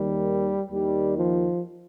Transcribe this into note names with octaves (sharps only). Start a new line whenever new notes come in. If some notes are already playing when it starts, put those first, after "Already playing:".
Already playing: D#2 D#3 G3
D#2 D#3 G3
F3